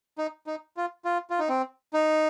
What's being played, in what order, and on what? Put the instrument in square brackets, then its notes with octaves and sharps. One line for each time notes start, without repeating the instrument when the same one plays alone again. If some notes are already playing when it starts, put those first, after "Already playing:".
[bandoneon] D#4
D#4
F4
F4
F4
D#4
C4
D#4